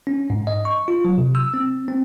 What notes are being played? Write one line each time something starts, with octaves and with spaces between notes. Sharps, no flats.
C#4
G#2
D#5
C#6
F4
F#3
C3
E6
C4
C4